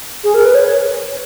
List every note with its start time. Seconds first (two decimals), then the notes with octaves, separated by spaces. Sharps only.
0.24 G#4
0.34 A#4
0.45 B4
0.55 C#5